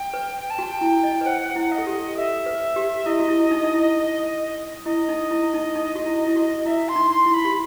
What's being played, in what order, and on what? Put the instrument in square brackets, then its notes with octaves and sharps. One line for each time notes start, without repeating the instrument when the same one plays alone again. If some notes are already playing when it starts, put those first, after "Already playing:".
Already playing: [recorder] G5
[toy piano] B4
[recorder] G5
A5
[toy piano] F#4 [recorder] G5
[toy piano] E4
D#5
B4
[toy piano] C5 [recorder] F#5
[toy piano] E4
[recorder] D#5
[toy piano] A4
G4
[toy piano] A4 [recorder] E5
[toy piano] B4
G4
[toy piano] E4 [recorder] D#5
[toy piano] F#4
E4
D#4
D#4
E4
[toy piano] E4 [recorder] D#5
[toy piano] D#4
E4
D#4
D#4
F#4
E4
E4
F#4
[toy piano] E4 [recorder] E5
[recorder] C6
[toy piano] D#4
[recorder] C6
[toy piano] E4
[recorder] B5
[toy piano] G4